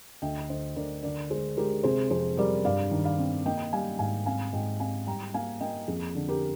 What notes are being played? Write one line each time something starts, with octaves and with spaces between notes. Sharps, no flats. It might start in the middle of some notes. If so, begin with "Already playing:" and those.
D2 D#5 G5
D2 C5 D#5
D2 A#4 D5
D3 A#4 D5
G#3 G#4 C5
G#3 G4 A#4
C3 G#4 C5
F2 G#4 C5
G3 A#4 D5
G2 D5 F5
D#3
D5 F5
C4
A#3 D#5 G5
G3 F5 G#5
G#2 F5 G#5
C4 F5 G#5
G#2 D#5 G5
C4 F5 G#5
G3 G5 A#5
A#3 F5 G#5
A#3 D#5 G5
F2 G#4
D3
G4 A#4